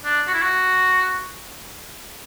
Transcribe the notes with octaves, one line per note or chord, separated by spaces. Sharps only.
D4
F#4
E4
F#4